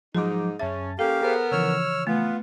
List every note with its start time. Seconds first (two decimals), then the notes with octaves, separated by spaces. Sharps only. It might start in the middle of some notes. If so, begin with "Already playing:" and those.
0.15 G#2 F3 F#3 D#4 G#4 D6
0.59 F#2 C#3 C#4 E5 A5 A6
0.99 A#3 C#4 G4 A4 F5
1.22 B3 G#4 A#4 C5
1.52 C#3 E3 F3 C#5 E6 F6
2.07 A3 B3 F4